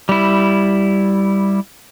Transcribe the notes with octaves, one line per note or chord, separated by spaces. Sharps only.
G3 E4